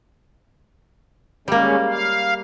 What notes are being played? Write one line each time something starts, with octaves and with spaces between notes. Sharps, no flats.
G3 G#3 A#3 C#4
F5